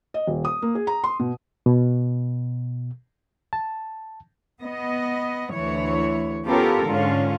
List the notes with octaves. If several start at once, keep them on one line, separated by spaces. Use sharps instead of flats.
D#5
D#1
D#6
A#3
G#4
A#5
C6
B2
B2
A5
B3 D#5
D2 E3 C#5
B3 C#4 F4 G4 A4 A#4
G#2 D3 C#4 F4